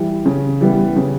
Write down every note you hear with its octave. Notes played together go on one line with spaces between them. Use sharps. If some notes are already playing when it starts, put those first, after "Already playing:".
Already playing: E3 G3
C#3
E3 G3 B3
C#3